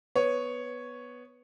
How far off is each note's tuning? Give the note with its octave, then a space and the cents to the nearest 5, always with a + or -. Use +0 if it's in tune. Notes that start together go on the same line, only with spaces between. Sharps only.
B3 +0 C#5 +0